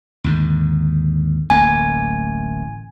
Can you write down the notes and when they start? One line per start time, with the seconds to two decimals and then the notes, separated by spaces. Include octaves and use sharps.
0.24 D#2 G#2 D3
1.50 D1 A1 A#3 G#5